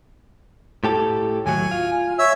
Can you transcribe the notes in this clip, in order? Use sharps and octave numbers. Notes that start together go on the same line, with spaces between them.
A2 G4 A4
D#2 A2 F#3 G#5
F4
C#5 E5 E6